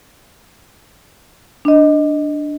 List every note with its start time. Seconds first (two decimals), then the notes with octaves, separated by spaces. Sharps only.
1.65 D4 D#5